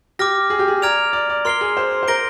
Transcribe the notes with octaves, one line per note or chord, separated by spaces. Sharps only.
G4 D6 F6 A#6
G#4
G4
G#4
D5 A#5 F6 G#6 D7 F7
D5
D5
A#4 C6 F6 C7 G7
G#4
C5
C5
A#4 G6 A#6 D7 G7